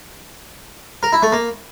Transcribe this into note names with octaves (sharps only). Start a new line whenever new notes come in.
A#4
E4
A3
A#3